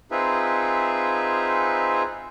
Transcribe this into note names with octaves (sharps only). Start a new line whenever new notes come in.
C4 D#4 F4 G#4 B4 E5